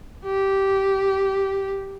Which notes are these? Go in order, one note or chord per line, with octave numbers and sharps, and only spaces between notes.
G4